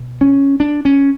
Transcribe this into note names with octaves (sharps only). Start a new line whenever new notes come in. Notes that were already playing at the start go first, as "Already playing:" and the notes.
Already playing: B2
C#4
D4
C#4